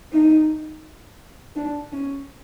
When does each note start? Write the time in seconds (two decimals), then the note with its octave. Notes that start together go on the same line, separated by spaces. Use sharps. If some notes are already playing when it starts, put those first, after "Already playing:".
0.13 D#4
1.56 D4
1.92 C#4